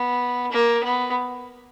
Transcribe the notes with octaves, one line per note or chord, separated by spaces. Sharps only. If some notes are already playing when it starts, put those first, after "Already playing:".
Already playing: B3
A#3
B3